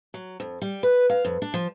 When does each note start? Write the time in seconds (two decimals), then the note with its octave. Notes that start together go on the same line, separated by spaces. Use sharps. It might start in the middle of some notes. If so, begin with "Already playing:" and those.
0.14 F#3
0.40 F2
0.62 G3
0.83 B4
1.10 F5
1.25 F2
1.42 D4
1.54 F3